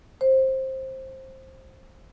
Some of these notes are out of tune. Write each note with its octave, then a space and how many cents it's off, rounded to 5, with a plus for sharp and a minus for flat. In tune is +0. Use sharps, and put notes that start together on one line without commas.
C5 +15